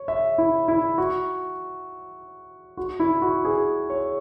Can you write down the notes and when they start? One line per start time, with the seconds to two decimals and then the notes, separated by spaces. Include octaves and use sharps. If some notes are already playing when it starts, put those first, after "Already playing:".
Already playing: C#5
0.08 E5
0.38 E4
0.68 E4
0.98 F#4
2.77 F#4
3.00 E4
3.22 F#4
3.45 G#4
3.90 C#5